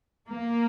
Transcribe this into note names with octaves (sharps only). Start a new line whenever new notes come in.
A#3